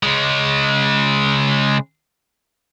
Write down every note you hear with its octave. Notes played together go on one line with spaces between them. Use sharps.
C#3 G#3